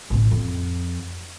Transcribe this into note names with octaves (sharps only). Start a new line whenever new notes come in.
A1 B2
F2